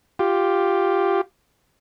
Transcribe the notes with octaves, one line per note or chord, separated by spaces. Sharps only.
F4 G4